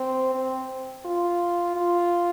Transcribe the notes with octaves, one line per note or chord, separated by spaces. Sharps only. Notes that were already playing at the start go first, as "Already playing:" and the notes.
Already playing: C4
C4
F4
F4